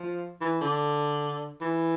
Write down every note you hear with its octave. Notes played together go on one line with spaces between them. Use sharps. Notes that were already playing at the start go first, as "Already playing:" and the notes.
Already playing: F3
E3
D3
E3